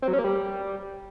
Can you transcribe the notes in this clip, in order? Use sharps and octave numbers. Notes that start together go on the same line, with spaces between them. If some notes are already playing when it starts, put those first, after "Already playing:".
C4
F#3
C#4
A#3
G3